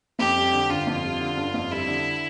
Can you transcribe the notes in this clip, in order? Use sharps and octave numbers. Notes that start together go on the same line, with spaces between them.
F2 G4
G3
D3
G1 F4
F2
G3
D3
G1
F2
G3 E4
D3